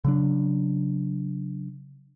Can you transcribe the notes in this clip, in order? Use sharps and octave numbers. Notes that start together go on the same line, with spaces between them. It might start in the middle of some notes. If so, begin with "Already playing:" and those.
C#3 F#3 D4